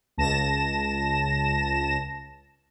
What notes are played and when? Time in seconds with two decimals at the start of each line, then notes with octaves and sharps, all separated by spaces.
0.18 C#2 A5 A#6 E7